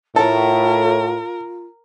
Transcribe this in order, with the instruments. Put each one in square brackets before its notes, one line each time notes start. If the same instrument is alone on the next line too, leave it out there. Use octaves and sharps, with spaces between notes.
[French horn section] A2 [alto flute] F4 [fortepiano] A4 [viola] A#4